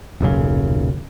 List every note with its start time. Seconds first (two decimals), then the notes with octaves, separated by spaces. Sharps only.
0.21 D#1 B1 F#2 C#3